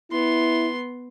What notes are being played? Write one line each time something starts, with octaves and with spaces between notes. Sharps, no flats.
B3 E4 C6